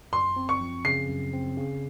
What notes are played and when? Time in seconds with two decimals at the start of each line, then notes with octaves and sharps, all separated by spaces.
0.13 F#2 C6
0.36 C4
0.49 C#6
0.61 F3
0.85 C#3 C7
1.09 F#2
1.33 C4
1.57 C#3